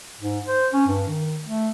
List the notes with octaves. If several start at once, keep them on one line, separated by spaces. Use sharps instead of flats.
G#2
C5
C#4
G2
D#3
A3